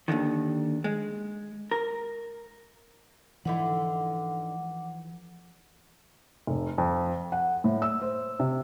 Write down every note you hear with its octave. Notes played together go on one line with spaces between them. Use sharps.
D#2 B2 D3 D#3
G#3
A#4
G#2 D3 E3 F3 E4 F#5 D6
F1
F2
F#5
A2
E6
C5
C3